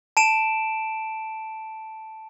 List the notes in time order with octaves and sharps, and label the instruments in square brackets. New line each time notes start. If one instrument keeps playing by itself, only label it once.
[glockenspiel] A5 D7 E7